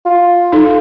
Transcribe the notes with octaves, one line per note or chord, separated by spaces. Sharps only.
F4
D#4 A4